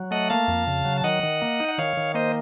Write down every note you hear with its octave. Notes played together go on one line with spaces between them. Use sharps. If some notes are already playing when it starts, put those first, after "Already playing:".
Already playing: F#3
A3 D#5 F#5
A#3 F5 A5
F2
C#3
F#3
A5
D#3 D#5 F#5
D#3
A#3
D#4
F#5
D#3 C#5 F5
D#3
A#3 C5 D#5